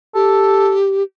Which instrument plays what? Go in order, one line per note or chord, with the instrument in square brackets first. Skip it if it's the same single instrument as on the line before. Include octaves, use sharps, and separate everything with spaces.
[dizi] G4 [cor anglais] A4